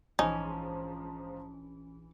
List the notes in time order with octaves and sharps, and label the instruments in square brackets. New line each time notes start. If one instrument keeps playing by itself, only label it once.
[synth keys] A#1 E3 [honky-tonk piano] G#2 F3 [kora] C#4 [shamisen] D#4